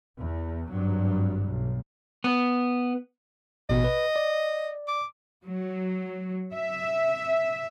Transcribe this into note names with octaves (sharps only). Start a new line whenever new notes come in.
E2
G#1 G2 F#3
B1
B3
A1 B2 D#5
B4
D5
D6
F#3
E5